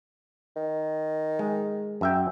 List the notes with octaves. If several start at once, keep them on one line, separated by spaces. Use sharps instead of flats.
D#3
G#3
F#2 E5 G5